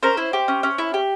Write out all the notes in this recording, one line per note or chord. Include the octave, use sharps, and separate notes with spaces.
C#4 A#4 C5
E4
G4
C#4
C#4
E4
G4